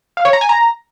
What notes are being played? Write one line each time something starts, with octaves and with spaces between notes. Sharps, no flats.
F5
C#5
A#5
G#5
A#5